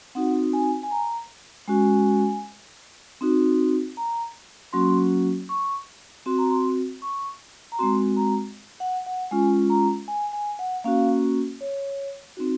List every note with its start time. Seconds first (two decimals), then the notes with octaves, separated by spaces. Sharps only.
0.15 C4 D#4 F#4 F#5
0.53 G#5
0.83 G#5
0.91 A#5
1.68 G#3 C#4 F#4 G#5
3.21 C4 D#4 F#4
3.97 A#5
4.73 F#3 A#3 C#4 F#4 C6
5.49 C#6
6.26 C4 F#4 C6
6.38 A#5
6.50 C6
7.02 C#6
7.72 A#5
7.79 G#3 C4 F#4 C6
8.17 A#5
8.80 F#5
9.06 F#5
9.31 G#3 C#4 F4 G#5
9.70 A#5
10.08 G#5
10.33 G#5
10.59 F#5
10.84 A#3 C#4 F#4 F5
11.61 C#5
12.37 C4 D#4 F#4